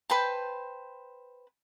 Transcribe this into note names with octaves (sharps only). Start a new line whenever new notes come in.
B4 C5 G5 A5